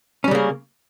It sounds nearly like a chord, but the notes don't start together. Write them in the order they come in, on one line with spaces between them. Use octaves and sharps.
C#4 G3 C#3 A#3